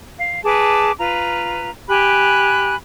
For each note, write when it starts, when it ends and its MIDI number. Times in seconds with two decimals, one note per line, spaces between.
0.18 0.42 77
0.44 0.92 68
0.44 0.92 71
0.44 0.92 81
0.44 0.92 86
0.98 1.70 65
0.98 1.70 71
0.98 1.70 82
1.89 2.75 67
1.89 2.75 80
1.89 2.75 83
1.89 2.75 90